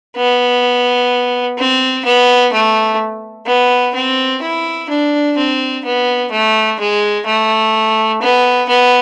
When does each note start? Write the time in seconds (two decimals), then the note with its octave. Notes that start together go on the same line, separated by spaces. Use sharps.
0.16 B3
1.58 C4
2.05 B3
2.53 A3
3.47 B3
3.95 C4
4.42 E4
4.90 D4
5.37 C4
5.85 B3
6.32 A3
6.80 G#3
7.26 A3
8.21 B3
8.68 B3